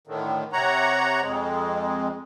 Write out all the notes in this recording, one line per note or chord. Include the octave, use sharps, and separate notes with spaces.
A2 D3 D#3
C3 C#5 F#5 A#5
F2 G#3